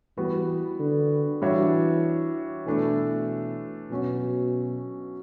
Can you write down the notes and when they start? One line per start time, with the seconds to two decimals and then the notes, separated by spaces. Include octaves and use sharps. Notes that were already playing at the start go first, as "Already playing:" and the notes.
0.17 E3 G3 B3 F#4
0.79 D3
1.42 E3 G3 D4 F#4 C#5 E5
2.66 B2 E3 A3 D4
3.91 B2 F#3 C#4 F#4